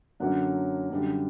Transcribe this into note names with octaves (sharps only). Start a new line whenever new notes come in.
F#2 D3 F#3 A#3 C#4 F#5
F#2 D3 G3